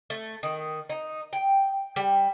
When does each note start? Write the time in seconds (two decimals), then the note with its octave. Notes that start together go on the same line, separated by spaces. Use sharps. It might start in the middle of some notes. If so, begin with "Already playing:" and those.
0.10 A3
0.43 D#3
0.89 D#4
1.33 G5
1.96 G3